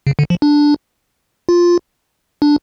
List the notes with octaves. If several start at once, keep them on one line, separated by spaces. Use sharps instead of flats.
C#3
D3
F3
D4
F4
D4